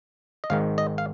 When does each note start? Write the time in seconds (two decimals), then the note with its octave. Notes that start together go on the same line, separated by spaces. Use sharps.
0.44 D#5
0.50 G#1 G#2 D#3 F5
0.78 D#5
0.98 F5